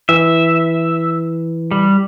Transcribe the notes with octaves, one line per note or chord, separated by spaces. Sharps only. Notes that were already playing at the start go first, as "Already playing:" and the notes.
E3 E5
G3